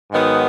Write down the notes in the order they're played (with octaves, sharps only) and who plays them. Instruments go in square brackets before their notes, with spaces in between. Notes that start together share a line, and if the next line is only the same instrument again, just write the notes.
[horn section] G#2 D#3 F#3 B3